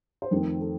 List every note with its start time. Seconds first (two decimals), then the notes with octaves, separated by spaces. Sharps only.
0.22 C5
0.31 F2 D#3 A3 C4 A#4
0.61 A4